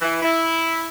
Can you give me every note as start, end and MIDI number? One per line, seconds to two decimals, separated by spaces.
0.02 0.19 52
0.22 0.88 64